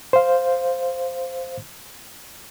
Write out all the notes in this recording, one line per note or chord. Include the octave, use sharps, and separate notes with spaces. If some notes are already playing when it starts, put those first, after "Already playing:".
C5 F5